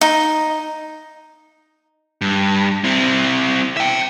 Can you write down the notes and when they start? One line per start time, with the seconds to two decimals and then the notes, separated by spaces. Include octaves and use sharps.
0.01 D#4
2.21 G2
2.84 C4 E4
3.77 E5 G5